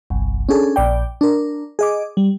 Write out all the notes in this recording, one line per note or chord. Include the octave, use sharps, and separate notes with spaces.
G1 C2
C#4 D4 G#4 A4
A#1 D5 G5
D4 A#4
G#4 D#5 D6
G3